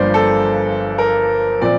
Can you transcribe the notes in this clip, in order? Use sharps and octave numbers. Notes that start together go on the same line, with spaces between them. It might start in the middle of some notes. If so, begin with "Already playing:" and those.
Already playing: G1 G2 F3 A#3 C5 D5
A4
A#4
A#2 F3 C4 D5